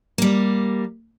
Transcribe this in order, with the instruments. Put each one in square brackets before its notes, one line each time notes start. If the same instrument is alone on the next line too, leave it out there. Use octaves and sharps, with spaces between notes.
[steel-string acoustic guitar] G3 A#3